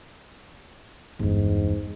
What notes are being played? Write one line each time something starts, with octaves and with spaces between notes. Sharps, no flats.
G1 E2 G#2